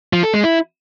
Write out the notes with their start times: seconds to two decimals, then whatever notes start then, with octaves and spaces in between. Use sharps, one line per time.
0.13 F3
0.23 A4
0.33 G#3
0.43 E4